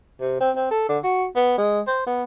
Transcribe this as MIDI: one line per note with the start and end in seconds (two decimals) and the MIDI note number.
0.21 0.39 48
0.41 0.51 60
0.56 0.69 60
0.71 0.84 69
0.89 0.98 50
1.04 1.25 66
1.35 1.56 59
1.58 1.80 56
1.87 2.05 72
2.07 2.23 59